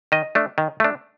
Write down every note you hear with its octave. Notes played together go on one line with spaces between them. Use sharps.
D#3 D#5
A3 D4
D#3
A3 D4